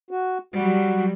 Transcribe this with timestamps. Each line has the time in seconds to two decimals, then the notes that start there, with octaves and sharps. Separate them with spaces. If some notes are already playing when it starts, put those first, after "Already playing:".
0.11 F#4
0.54 F#3 G3 F#4